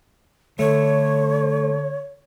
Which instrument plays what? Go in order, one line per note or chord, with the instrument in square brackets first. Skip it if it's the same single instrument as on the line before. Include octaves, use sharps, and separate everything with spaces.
[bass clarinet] D3 [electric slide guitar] A3 [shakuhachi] C#5